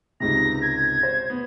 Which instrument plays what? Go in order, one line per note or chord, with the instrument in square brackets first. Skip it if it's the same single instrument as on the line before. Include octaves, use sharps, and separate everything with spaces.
[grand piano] C#2 G#2 C3 [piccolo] A#6
[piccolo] G#6
[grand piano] C5
B3